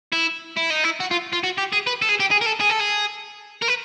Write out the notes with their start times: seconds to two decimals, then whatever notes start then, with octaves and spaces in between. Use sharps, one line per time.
0.12 E4
0.57 E4
0.70 D#4
0.84 E4
1.00 F#4
1.11 F4
1.33 F4
1.44 F#4
1.58 G4
1.73 G#4
1.87 B4
2.02 A4
2.09 G#4
2.20 G4
2.31 G#4
2.41 A#4
2.46 A4
2.60 G#4
2.70 A4
2.80 G#4
3.62 A#4
3.68 B4